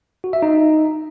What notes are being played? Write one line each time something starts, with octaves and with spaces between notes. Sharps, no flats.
F#4
E5
D#4